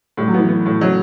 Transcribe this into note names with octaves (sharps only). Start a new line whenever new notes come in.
A2 G3
F#3
E3 B3
B3
A2
C#3 F#3